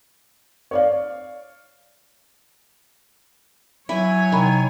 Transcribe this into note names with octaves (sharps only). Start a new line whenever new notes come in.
C#5 D5 F5
F#3 E4 C#5 G#5
C3 D#3 A#5 B5